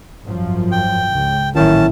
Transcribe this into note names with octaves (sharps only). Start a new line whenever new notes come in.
G#1 F#2 F3
G5
C#2
A1 A#2 D#3 F#3 C#4 E4 A5